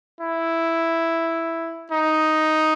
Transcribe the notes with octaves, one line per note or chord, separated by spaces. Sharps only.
E4
D#4